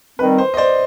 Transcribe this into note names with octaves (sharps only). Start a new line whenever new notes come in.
D#3 G3 C4 B4
C5
D#5
C5 D5